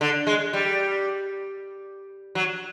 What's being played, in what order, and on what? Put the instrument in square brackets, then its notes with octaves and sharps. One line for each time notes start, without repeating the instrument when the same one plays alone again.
[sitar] D3
G#3
G3
F#3